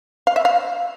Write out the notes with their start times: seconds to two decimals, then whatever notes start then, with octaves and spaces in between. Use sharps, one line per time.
0.27 F5
0.36 E5
0.45 F5